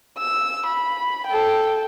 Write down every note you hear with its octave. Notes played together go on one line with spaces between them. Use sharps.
E6
B5
A4 G5